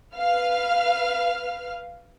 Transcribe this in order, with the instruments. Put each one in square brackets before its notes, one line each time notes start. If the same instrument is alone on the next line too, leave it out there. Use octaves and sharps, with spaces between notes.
[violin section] B4 F5 F6